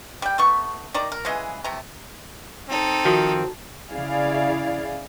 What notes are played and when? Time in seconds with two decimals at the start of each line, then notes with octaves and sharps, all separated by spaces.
0.22 G3 G5
0.38 A3 B3 C#6
0.94 D#3 D5 A#5
1.12 A#4
1.25 C#3 E3 G#3 G#4
1.64 C3 A3 A#5
2.69 C4 D#4 A4
3.05 D#3 F3 F#4
3.91 C#3 E4 G#4 D5 F5